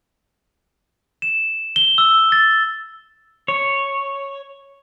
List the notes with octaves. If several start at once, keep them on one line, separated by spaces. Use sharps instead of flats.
E7
G7
E6
A6
C#5